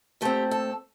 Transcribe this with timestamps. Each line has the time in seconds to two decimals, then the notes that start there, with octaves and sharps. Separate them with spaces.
0.21 A#2 A3 C4 G4
0.51 A4